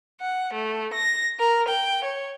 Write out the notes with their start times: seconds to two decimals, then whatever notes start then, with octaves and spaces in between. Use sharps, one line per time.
0.20 F#5
0.54 A3
0.93 A#6
1.39 A#4
1.69 G5
2.04 C#5